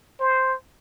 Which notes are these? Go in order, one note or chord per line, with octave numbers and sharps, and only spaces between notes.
C5